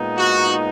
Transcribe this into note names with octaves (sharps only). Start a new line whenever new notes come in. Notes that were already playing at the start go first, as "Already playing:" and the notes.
Already playing: A#2 G#3 B3 D#4
F#4